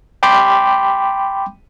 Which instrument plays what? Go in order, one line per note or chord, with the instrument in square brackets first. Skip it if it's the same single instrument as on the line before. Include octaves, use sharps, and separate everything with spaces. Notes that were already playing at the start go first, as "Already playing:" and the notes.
[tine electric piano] G5 B5 C6 D6 G6